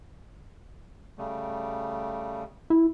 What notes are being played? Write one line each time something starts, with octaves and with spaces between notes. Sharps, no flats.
C#3 G3 A3
E4